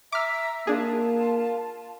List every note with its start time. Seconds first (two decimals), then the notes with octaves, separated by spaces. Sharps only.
0.12 E5 A#5 D6 E6 F6
0.67 A#3 D4 F4 G#4 A5